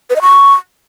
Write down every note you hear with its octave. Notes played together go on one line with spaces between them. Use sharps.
B4
D#5
C#6